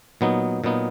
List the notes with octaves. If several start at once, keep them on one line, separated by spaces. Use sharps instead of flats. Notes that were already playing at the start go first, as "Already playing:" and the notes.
A#2 F#3 B3 D#4
A#2 F#3 B3 D#4